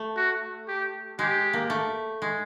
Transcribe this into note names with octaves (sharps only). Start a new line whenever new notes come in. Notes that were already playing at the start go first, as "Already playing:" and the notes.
Already playing: A3
F#4
G4
G#3 G4
A#3
A3
G#3